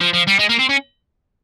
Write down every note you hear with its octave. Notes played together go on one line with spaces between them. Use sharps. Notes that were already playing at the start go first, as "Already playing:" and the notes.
F3
F3
G3
G#3
A#3
C4
C#4